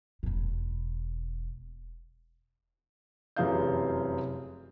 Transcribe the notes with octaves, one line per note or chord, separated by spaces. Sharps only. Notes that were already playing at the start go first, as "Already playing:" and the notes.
E1 B2
F1 F#2 E3 G#4 F5 G6